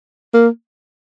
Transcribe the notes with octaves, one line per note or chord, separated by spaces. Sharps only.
A#3